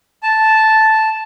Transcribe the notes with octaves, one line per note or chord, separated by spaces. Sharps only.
A5